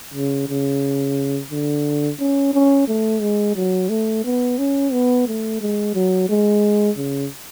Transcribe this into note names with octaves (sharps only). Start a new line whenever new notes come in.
C#3
C#3
D3
C#4
C#4
A3
G#3
F#3
A3
B3
C#4
B3
A3
G#3
F#3
G#3
C#3